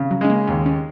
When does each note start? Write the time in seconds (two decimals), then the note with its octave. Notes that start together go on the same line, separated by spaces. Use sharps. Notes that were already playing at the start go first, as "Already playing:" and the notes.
Already playing: C#3
0.11 F#3
0.21 G#3 C#4
0.30 A#3
0.47 D#2 C#4
0.66 C#4